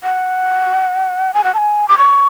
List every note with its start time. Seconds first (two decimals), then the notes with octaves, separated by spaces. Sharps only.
0.03 F#5
1.34 G#5
1.44 F#5
1.54 A5
1.58 G#5
1.88 D6
1.98 C#6